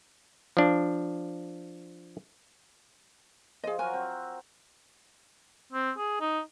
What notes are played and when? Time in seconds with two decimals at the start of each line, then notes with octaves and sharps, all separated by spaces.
0.57 F3 D4
3.64 F3 G#4 D#5
3.79 F#3 F#4 A#4 G#5
3.93 C4
5.72 C4
5.97 G#4
6.21 D#4